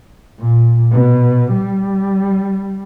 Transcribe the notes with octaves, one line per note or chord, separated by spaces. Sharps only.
A#2
B2
G3